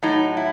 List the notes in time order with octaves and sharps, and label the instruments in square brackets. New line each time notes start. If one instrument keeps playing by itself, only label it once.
[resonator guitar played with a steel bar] A2 F#3 D#4
E4